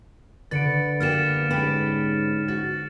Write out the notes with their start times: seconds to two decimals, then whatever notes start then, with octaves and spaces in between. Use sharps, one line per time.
0.51 D3 B4 A6 C#7 D7
1.00 A#3 B3 G4 F6 A6 E7
1.50 G#2 C#4 G4 B4
2.48 F#4 A6